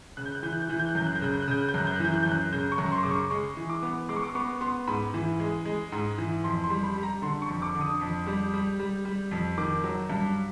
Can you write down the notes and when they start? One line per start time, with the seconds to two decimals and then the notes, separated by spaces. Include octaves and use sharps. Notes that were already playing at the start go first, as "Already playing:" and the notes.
0.17 C#3 F#6
0.26 G6
0.35 F#6
0.43 E3 G6
0.53 F#6
0.62 G6
0.69 E3 F#6
0.79 G6
0.88 F#6
0.95 F#2 G6
1.06 F#6
1.16 G6
1.21 C#3 F#6
1.34 G6
1.42 F#6
1.48 C#3 G6
1.60 F#6
1.69 G6
1.74 F#2 F#6
1.87 G6
1.96 F#6
2.00 E3
2.05 G6
2.14 F#6
2.23 F#2 G6
2.32 F#6
2.52 C#3 G6
2.72 C#6
2.78 F#2
2.86 C#6
2.92 C6
3.03 C#3 D6
3.11 C#6
3.30 G#3 C#6
3.57 E3
3.69 D6
3.83 B3
4.09 G#3 D6
4.16 C#6
4.23 D6
4.35 B3 C#6
4.61 B3 C6
4.87 G#2 B5
5.14 E3
5.40 G#3
5.65 G#3
5.92 G#2
6.18 E3
6.44 F2 C6
6.64 C6
6.70 G3
6.83 B5
6.96 G3
7.03 A#5
7.22 D3 C6
7.42 C#6
7.48 F2
7.62 D6
7.75 D3
7.81 D#6
8.01 F2
8.27 G3
8.54 G3
8.79 G3
9.05 G3
9.31 F2
9.58 D#3 D6
9.84 F#3
10.10 G2